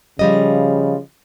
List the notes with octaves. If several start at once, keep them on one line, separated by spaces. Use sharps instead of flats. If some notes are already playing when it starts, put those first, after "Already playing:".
C#3 F3 G3 D#5